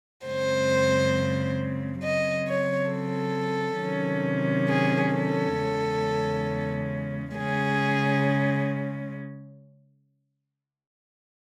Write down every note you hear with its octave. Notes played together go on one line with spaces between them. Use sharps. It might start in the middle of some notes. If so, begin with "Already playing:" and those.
F#2 C#3 G#3 C4 C5
C#3 F#3 C4 D#5
C#5
A4
C3 D#3 F#3 C#4
G#4
A4
E2 C#3 G#3 C#4
C#3 G#3 C#4 G#4